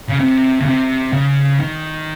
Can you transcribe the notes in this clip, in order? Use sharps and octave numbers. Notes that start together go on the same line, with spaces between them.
C#3
C3
C#3
C3
C#3
D#3